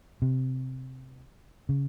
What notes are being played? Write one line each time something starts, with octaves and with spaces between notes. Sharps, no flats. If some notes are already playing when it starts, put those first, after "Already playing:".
C3
C#3